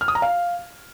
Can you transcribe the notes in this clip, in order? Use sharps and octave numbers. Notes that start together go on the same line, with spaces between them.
F6
D#6
A#5
F5